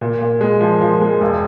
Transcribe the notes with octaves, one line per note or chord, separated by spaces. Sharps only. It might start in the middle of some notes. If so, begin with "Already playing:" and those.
A#2
A#2
G#3
F3
F3
G#3
E1